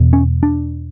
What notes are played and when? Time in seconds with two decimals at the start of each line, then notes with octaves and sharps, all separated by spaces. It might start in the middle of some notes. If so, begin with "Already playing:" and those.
Already playing: E2 B2
0.13 C#4
0.43 D4